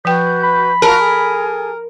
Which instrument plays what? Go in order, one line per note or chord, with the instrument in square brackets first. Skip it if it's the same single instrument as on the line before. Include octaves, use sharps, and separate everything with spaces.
[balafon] F3 G5 [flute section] F#4 B4 G6
[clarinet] B5
[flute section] F4 F#4 [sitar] A#4 [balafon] A5
[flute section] G#4 A4 G#5